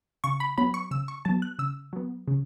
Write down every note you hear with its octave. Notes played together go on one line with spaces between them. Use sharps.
C#3 C#6
B5
F#3 B3 B5
C#6
C#3 E6
C#6
F#3 B3 A5
F#6
C#3 E6
F#3 B3
C#3